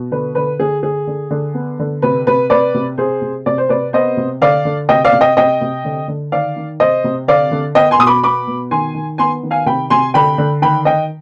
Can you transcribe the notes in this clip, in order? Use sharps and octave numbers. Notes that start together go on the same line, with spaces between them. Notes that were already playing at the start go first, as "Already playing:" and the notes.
Already playing: B2
D3 B4
D3 B4
D3 G#4
D3 G#4
D3
D3
B3
D3
C3 B4
C3 B4
C3 B4 D5
C3
C3 G#4 C5
C3
C3 D5
C5
C3 B4 D5
B3 C5 D#5
C3
D3 D5 F5
D3
C3 D#5 G5
D5 F5
C3
D#5 G5
C3 D#5 G5
C3
D3
D3
D#3 D5 F5
D#3
C3 C5 D#5
C3
D3 D5 F5
D3
B3 D#5 G5
G#5 C6
B2 D#6
B5 D6
B3 B5 D6
B2
D#3 G#5 C6
D#3
B3 G#5 C6
D#3
F5 G#5
C3 G5 B5
C3 G#5 C6
D3 G5 B5
D3
D#3 G5 B5
D#3 D#5 G5